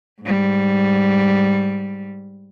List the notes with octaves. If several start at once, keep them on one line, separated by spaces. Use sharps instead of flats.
G#2 G3